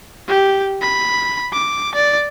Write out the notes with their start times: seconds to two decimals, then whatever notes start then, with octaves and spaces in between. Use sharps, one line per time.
0.28 G4
0.82 B5
1.53 D6
1.95 D5